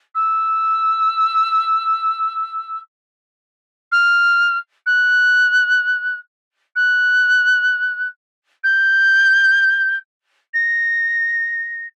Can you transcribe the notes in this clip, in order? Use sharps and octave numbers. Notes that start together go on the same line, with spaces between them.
E6
F6
F#6
F#6
G6
A#6